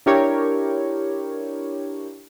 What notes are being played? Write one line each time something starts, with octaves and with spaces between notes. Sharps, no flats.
D4 E4 G4 A#4 C#5